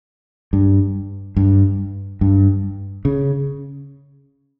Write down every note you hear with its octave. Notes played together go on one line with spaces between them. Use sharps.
G2
G2
G2
C#3